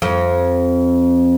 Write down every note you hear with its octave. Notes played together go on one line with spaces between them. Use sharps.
F2